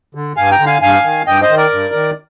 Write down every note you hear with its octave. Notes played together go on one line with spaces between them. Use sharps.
D3
G2 F5 G#5
G5 A#5
D3
F5 G#5
G2 F5 G#5
D#3
G2 D#5 G5
C5 D#5
D#3
A#4 D5
G2
D#3